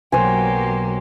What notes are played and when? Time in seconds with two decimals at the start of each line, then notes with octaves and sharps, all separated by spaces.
0.12 B1 F#3 A#3 G4 C5 G#5